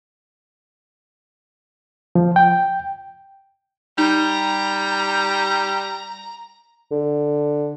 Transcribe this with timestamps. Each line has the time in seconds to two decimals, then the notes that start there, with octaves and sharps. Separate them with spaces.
2.15 F3
2.36 G5
3.98 G3 D#4 A#5
6.91 D3